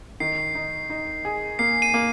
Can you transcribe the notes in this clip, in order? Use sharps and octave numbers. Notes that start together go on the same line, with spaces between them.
D#3 C7
D#4
D#4
G#4
A#3 C7
D#7
A#3